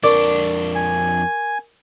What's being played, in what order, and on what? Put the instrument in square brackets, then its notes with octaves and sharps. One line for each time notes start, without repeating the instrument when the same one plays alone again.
[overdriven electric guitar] F2 D4 [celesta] A#4 C#6 [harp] D5
[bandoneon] G#5